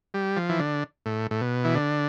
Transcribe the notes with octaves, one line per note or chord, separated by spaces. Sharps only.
G3
F3
E3
D3
A2
A2
B2
E3
D3